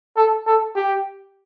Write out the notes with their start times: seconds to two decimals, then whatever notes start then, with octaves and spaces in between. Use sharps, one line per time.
0.17 A4
0.47 A4
0.76 G4